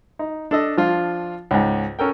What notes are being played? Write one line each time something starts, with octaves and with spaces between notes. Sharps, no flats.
D#4
D4 A4 D#5
F3 D4 F4
C#2 G#2
C#4 A4 A#4 G5